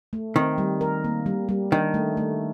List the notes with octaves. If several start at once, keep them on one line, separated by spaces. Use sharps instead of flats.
A3
D#3 C4
G3
A#4
A#3
G3
G3
D#3 D4
A3
A3